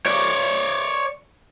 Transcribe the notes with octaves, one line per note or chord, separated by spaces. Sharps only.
C#5 D5